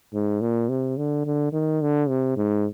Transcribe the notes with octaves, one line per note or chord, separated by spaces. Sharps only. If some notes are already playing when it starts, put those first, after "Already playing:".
G#2
A#2
C3
D3
D3
D#3
D3
C3
G#2